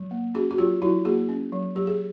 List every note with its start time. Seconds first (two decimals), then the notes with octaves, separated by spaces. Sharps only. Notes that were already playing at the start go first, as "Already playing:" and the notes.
Already playing: F#3
0.11 A#3
0.34 C#4 F#4 G#4
0.51 F#4
0.58 F#3 F4 G4
0.82 F#3 E4 F#4
1.05 A#3 F#4 G#4
1.29 C#4
1.52 F#3
1.76 F#3 G4
1.87 G#4